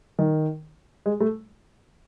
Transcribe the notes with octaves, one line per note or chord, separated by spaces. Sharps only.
D#3
G#3
A3